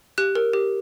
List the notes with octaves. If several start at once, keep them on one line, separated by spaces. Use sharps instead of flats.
G4 F#6
A#4
G4